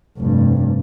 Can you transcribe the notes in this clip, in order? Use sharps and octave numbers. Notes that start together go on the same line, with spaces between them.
F1 G2